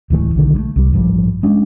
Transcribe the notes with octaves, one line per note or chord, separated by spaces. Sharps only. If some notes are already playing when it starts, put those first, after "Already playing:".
D1 A2 E3 A3
B1 D3 D#3
G3 A3
C2 G3
A1 G2 F3 G3
G#3 C#4 D4